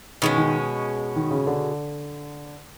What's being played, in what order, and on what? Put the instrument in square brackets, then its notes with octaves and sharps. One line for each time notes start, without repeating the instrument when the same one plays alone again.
[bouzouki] B2 G#3 C#4 [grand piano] D#3
[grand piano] D#3
D#3
C#3
D3